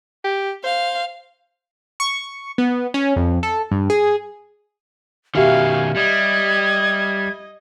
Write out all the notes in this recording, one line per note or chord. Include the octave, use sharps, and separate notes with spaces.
G4
C5 F5
C#6
B3
C#4
F2
A4
G2
G#4
B2 D#3 F#4 G4 E5 F5 G#5
G3 D#5 G#6